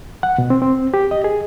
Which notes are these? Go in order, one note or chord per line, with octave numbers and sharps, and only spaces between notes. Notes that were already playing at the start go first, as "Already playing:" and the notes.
F#5
B2
C4
C4
G4
D#5
G#4